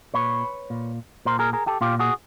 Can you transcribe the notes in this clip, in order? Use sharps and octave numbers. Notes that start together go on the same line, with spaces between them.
A#2 B4 C#5
A#2
A#2 A#4 C5
G#4 A#4
G#4 A#4
G4 A4
A#2 F4 G4
F#4 G#4